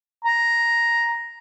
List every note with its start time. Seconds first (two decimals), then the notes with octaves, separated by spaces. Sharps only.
0.25 A#5